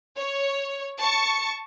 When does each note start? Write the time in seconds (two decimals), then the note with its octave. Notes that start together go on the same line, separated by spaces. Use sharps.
0.17 C#5
1.00 A5 C#6 C#7